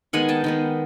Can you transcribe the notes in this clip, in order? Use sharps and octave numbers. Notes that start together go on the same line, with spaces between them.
D#3 G#3 B3 F#5 G#5
G5 A5
D#3 G#3 B3